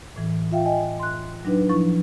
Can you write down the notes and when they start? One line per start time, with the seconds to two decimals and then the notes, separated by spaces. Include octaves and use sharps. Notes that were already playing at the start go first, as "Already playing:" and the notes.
0.16 A2 E3
0.52 F4 E5 F5 G5
0.65 D#5 G5 G#5
0.99 C6 F#6
1.45 F#3 D4 D#4 B4
1.69 F3 E4 C#6